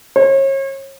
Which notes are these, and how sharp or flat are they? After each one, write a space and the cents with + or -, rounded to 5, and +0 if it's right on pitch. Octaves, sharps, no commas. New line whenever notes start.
C#5 -35